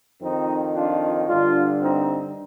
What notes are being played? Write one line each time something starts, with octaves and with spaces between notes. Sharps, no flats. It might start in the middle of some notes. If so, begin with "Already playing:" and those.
F2 D#3 C4 D#4
D4 F4
G2 D3 D4 F4
C4 D#4